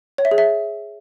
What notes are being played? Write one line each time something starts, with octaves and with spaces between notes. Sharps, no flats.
C#5
E5
G#4
E5